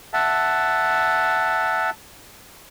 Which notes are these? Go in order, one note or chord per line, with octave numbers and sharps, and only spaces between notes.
E5 F#5 A5